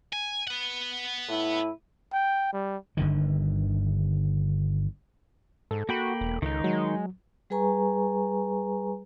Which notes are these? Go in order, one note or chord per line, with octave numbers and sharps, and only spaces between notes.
G#5
B4 F#5
A2 E4
G5
G3
G1 D3 D#3
G#2 A4
A#3 F#4 G5 B5
E1
C#2 D#3 D#4
F#3 G#3
G3 G#4 B4 G#5 A#5 C#6